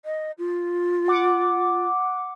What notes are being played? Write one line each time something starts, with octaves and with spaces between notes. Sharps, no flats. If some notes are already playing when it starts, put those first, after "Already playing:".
D#5
F4
F#5 D6